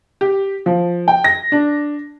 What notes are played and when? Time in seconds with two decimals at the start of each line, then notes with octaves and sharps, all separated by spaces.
0.21 G4
0.66 F3
1.08 G5
1.24 A#6
1.52 D4